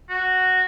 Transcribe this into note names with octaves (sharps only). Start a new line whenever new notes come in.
F#4